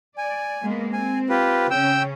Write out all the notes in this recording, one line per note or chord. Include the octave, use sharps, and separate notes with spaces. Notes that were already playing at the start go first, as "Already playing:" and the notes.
D5 G#5
G#3 A#3 B3
C4 G#5
F4 G4 B4
C#3 C#4 G5 E6